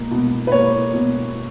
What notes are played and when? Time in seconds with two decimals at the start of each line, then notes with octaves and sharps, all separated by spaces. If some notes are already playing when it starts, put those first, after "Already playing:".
Already playing: B2 A#3
0.11 B2
0.47 B4
0.52 A#3 C#5
0.94 B2